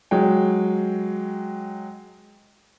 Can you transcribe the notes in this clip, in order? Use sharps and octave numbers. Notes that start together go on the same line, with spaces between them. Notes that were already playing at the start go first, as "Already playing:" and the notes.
F#3 G#3 G5